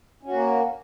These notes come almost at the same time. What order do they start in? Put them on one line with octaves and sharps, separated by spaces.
C#4 F#4 A#3